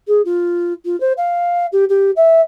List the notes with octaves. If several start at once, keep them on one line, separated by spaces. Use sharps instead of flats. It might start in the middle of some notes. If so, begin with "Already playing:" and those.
G#4
F4
F4
C5
F5
G4
G4
E5